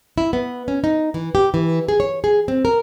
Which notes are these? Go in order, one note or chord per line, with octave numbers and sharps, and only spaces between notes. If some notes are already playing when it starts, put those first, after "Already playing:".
E4
B3
C#4
D#4
E3
G4
E3
G#4
C#5
G#4
C4
A#4